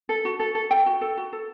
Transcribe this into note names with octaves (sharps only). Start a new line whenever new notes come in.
A4
F#4
A4
A4
A4 G5
F#4
A4
F#4
A4